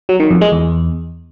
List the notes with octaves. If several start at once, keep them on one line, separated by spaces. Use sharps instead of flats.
F#3
D#3
F2
G#3
E2